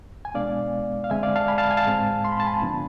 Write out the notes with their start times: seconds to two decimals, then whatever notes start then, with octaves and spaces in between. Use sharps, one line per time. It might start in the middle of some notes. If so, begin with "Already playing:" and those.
0.25 G#5
0.34 B2 G#3 B3 D4 D5 F5
1.04 F5
1.10 D3 G#3 C4 E5 G#5
1.23 D5 F5
1.36 F5 A5
1.48 G#5 B5
1.58 F5 A5
1.71 G#5
1.77 F5 A5
1.86 A2 G#3 C4
2.25 C6
2.32 B5
2.40 A5
2.47 G#5 B5
2.62 D3 F3 B3 D4